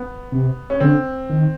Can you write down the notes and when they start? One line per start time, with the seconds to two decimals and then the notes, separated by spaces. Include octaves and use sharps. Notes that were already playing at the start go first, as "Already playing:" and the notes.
Already playing: B3
0.32 C3
0.70 C#4
0.80 D3 C4
1.29 D#3